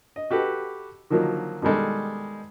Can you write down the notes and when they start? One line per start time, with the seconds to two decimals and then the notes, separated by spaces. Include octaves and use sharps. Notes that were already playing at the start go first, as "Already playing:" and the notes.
0.16 D#5
0.31 F#4 G4 A4 B4
1.10 D3 D#3 F3 F#3 A#3
1.62 B2 D#3 G3 G#3 A4